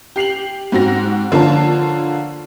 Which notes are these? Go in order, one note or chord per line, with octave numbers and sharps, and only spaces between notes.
G4 C7 F7 F#7
G#2 C4 F#4 A#6
D3 F3 A#3 F4 C#5 A5